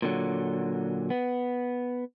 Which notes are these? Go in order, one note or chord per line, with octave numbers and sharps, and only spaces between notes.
A#2 D3 F#3
B3